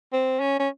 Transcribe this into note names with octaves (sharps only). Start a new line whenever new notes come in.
C4
C#4
C#4